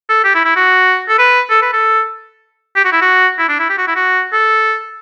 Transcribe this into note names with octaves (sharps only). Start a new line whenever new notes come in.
A4
G4
E4
E4
F#4
A4
B4
A4
B4
A4
G4
F#4
E4
F#4
E4
D4
E4
G4
F#4
E4
F#4
A4